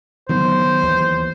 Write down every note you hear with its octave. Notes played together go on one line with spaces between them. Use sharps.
D#3 F#3 B3 C5
D#2 E3